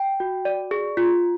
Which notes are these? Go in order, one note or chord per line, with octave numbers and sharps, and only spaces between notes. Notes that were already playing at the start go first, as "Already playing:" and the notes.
Already playing: G5
F#4
D5
G#4
F4